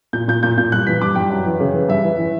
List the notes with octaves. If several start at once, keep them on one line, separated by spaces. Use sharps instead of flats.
A#2 G6
A#2 G6
A#2 G6
A#2 G6
G2 F#6
E3 B6
G2 D6
G2 G5
F#2
E3
C#3
E3
G2 E5
E3
E3